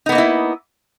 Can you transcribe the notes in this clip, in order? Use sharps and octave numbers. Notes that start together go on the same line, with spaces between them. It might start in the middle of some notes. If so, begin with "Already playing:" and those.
A#3 B3 D#4 E4 D#5